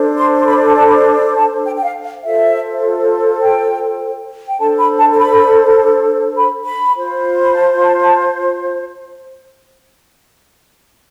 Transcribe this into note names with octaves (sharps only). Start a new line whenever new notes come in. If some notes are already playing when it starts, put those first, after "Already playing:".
Already playing: D4 A4 C5
C6
C6
B5
A5
A5
B5
A5
A5
G5
G5
F5
F5
F4 A4 C5 E5
G5
G5
D4 A4 C5 A5
B5
A5
A5
B5
B5
B5
F4 C5
B5
A5
A5
A5